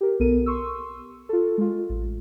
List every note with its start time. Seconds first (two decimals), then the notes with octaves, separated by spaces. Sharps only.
0.01 G4 A#4
0.20 B1 B3 A4 A#4 D#7
0.46 C6 C#6 E6
1.29 F4 A4
1.58 G#3 F4
1.89 A1